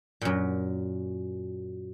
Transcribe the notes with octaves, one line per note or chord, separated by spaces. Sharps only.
F#2 A#2